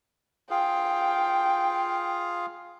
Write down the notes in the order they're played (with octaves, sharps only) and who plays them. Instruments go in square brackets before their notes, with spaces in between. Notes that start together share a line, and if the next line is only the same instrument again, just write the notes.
[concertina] F4 G#4 F5 [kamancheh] G5